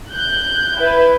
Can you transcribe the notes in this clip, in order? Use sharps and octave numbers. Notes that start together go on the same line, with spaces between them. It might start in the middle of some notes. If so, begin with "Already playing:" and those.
F#6 G6
E4 B4